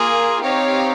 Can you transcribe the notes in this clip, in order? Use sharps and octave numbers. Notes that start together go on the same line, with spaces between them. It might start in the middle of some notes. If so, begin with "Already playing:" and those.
Already playing: A#3 F4 G#4
C4 D#4 G4 C#5 F5